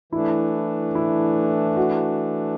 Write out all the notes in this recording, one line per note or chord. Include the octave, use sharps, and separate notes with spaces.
E3 A3 D4 E4
E4
F#4